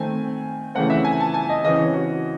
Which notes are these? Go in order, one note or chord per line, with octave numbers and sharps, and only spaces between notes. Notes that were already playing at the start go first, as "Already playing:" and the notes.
Already playing: D#3 A3 C4 G#5
C#3 E3 A3 C4 F#5
E5
G#5
A5
G#5
D#5
C#3 E3 C4 D#5
C#5
F#4